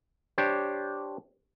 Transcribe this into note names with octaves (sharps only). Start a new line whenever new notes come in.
D4 G4 C5 C#5